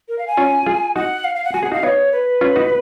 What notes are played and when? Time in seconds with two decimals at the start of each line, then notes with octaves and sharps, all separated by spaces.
0.09 A#4
0.19 F5
0.28 G#5
0.37 C#4 F4
0.66 F4 G#4
0.96 D#4 F#4 F#5
1.24 F5
1.35 F5
1.45 F#5
1.54 F#4 G#5
1.63 G#4 F#5
1.71 D#4 F#4 F5
1.83 B3 D#4 C#5
2.12 B4
2.41 C#4 F4
2.56 D#4 F#4